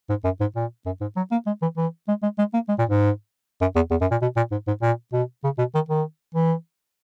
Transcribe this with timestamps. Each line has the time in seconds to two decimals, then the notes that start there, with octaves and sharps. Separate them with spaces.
0.10 G#2
0.24 F#2
0.40 G#2
0.56 A#2
0.86 F#2
1.01 G#2
1.17 F#3
1.31 A#3
1.46 G#3
1.62 E3
1.77 E3
2.08 G#3
2.23 G#3
2.39 G#3
2.54 A#3
2.69 G#3
2.79 A#2
2.89 G#2
3.61 F#2
3.75 E2
3.91 E2
4.01 F#2
4.11 A#2
4.22 B2
4.37 A#2
4.51 G#2
4.68 G#2
4.82 A#2
5.13 B2
5.44 C#3
5.58 B2
5.75 D#3
5.89 D#3
6.34 E3